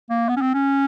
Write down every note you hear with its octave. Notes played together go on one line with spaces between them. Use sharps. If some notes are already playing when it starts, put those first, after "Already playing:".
A#3
B3
C#4
C4
C#4